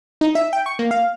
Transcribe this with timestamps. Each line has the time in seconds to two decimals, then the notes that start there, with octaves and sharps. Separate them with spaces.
0.21 D#4
0.35 E5
0.53 G5
0.66 C#6
0.79 A#3
0.91 F5